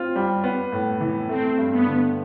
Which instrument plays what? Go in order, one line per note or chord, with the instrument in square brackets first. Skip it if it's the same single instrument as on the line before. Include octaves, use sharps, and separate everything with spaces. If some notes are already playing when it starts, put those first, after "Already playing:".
Already playing: [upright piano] C4 F4
G3
B3
A2
E3
[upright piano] A3 [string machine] C4
[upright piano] G2
[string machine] B3
[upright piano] D3